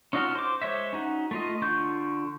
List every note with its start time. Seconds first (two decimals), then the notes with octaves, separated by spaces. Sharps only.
0.13 C#4 D#4 F4 F#4 A4
0.35 C5 D6
0.62 G#3 C5 C#5 E5
0.93 C#4 D#4 F#4
1.31 A3 F4 D#5
1.61 D3 F4 C#6 G6